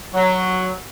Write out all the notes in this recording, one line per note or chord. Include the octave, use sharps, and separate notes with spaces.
F#3